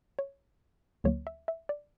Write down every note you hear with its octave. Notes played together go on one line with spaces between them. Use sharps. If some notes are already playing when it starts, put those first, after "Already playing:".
C#5
D2 D3 F#3 A#3 C#5
E5
E5
D5